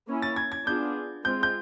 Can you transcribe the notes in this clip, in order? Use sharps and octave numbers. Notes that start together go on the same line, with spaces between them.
A#3 C#4 E4
A6
G#6
G#6
B3 D4 F4 G#4 G6
G#3 C4 F4 G6
G6